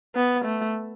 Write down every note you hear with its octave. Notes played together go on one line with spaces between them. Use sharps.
B3
A3